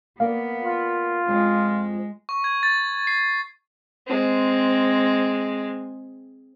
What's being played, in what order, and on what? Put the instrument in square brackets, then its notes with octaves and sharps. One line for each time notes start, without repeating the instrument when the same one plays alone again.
[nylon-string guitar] A#3 A#4 D5 [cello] B3 [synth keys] F5
[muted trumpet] F4
[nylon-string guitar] F2 F3 C#4 [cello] G#3
[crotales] C#6
G#6
A6
C7
[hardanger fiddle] G#3 C4